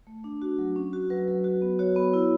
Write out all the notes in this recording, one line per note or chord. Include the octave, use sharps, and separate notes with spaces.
A3
D4
F#4
F#3
C#4
F#4
F#3 B4
F#3
F#4
B3
F#4 C#5
B3
E4